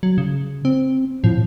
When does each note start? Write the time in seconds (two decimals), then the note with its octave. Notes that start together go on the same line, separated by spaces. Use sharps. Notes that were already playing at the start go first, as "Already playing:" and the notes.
0.03 F#3
0.18 C#3
0.65 C4
1.24 A2 F3